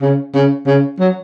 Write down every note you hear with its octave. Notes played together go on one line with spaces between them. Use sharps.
C#3
C#3
C#3
F#3